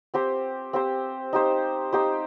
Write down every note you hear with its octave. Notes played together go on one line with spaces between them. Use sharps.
C4 G4 C5
C4 G4 C5
D#4 G4 C5
D#4 G4 C5